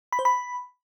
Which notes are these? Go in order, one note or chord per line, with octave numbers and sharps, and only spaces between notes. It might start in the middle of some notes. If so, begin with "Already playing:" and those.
B5
C5
B5